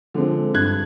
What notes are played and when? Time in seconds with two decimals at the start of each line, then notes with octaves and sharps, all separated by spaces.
0.14 D3 F3 G#3 C4
0.54 G2 F#6 G#6